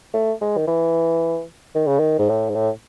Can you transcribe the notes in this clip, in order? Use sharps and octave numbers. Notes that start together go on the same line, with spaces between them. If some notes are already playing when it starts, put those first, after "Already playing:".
A3
G#3
D#3
E3
D#3
C#3
D#3
G#2
A2
G#2
A2